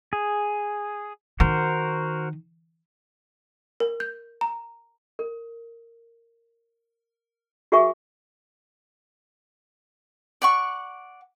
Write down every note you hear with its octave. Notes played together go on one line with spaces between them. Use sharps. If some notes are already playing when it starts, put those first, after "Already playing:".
G#4
D#3 F#4 A#4 C5
A#4
G6
A#5
A#4
F#4 G#4 A#4 E5 G#5 C#6
D5 F#5 C#6